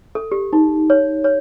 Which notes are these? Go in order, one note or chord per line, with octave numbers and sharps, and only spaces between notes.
A4
G4
D#4
C#5
C#5